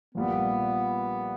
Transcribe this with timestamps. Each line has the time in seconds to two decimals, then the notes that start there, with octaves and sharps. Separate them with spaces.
0.15 A#1 A#2 G3 A#3 B3